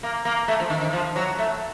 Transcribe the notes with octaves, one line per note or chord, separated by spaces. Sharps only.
A#3
A#3
A3
F3
D#3
D#3
F3
F#3
A3